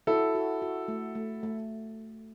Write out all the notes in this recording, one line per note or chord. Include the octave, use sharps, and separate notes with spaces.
E4 F#4 A4
F#4
F#4
A3
A3
A3